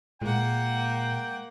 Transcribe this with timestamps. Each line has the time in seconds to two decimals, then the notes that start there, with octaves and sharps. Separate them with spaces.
0.22 A#2 G#3 A#3 F#5 G5